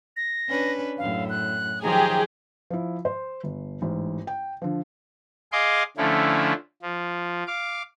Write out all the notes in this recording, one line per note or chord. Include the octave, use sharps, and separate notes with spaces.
A#6
C#4 D4 B4
F#2 A2 F5
F#6
D#3 F3 F#3 G4 G#4 A#5
F3 E4
C5
G1
A1 G#2
G5
D3 F3
G#4 D#5 F5 C6 D6
D3 F3 A3 C#4 E4
F3
F5 D6